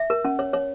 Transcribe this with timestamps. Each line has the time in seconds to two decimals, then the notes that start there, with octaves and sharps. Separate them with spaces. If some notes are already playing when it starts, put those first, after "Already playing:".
Already playing: E5
0.10 A#4
0.25 C#4
0.39 C#5
0.53 C#5